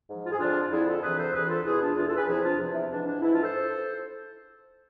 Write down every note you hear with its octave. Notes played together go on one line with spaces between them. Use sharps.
G#2 F3
F4
G#4
F2 D3 F3 D4 F4
F2 D3 F3 E4 G#4
F4 A4
D2 C3 E3 G#4 B4
A4 C5
D2 C3 E3 G#4 B4
F4 A4
E2 B2 E4 G#4
D4 F4
E2 B2 D4 F4
F4 A4
G#4 B4
E2 C3 F3 E4 G#4
D4 F4
E2 C3 F3
E4
G#2 E3 D4
D4
G#2 E3 E4
D4 F4
A4 C5